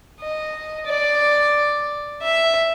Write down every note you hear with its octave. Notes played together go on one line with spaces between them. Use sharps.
D#5
D5
E5